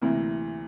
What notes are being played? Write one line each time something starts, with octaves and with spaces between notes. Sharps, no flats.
D2 C3 E3 A#3 E4